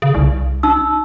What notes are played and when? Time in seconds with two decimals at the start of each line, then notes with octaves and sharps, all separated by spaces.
0.02 C#3
0.14 C2
0.63 D#4 E6